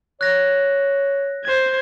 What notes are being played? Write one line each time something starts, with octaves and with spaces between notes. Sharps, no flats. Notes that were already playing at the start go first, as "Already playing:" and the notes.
C#5 F#6 A#6
C5 G#6